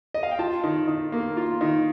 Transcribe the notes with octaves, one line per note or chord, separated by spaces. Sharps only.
D#5
F5
G5
F4 A5
D#3
D#3
A#3
F4
D#3